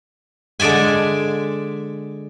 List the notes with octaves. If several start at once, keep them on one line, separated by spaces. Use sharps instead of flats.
D3 G#3 D5 E5 G#5